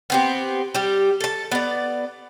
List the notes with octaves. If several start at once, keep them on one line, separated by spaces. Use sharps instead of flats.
B3 C4 G4
G3 G4
A4 A5
B3 D5